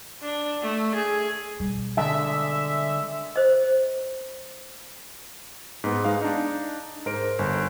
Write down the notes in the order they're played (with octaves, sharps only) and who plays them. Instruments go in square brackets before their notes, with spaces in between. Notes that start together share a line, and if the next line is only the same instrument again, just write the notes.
[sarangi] D4
A3
G#4
[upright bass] B2 G3
[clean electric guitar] D3 G#3 [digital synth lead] E5
[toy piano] C5 D#5
[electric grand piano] G#2 B3
G#3 D#4 F5
D4 D#4
G#2 A#4 C5 D7
G1